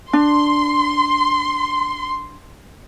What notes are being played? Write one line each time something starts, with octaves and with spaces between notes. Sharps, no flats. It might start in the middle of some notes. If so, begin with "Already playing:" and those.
D4 C6